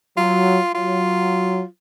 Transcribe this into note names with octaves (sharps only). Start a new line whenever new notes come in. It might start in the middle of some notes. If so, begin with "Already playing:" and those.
F#3 F4
F#3 F4